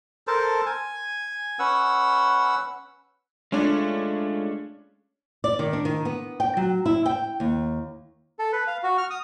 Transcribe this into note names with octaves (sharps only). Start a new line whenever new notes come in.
A4 A#4 C5 A5
G#5
C#4 B4 F#5 E6
G#3 A3 C#4 D4 F4
D5
D#3
D4
D#3
B3
G5
F#3
E4
G5
D#2
A4
B4
F5
F#4
F6
D#6